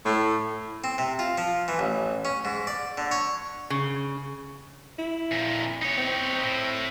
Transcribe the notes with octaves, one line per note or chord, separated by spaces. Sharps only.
A2
C4
C3
F4
F3
E3
A1
C#4
G#2
D5
D3
C#5
C#3
E4
F2 A#2
D#4 C#5
C4
A2